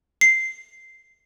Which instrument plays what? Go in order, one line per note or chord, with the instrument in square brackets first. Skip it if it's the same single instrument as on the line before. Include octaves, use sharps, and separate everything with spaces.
[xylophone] C7